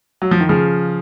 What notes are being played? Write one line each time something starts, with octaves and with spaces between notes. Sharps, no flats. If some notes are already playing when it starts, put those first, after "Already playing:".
F#3
F3
D#3
C#3 F3